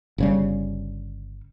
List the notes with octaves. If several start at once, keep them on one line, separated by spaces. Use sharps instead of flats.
G1 C#3 G3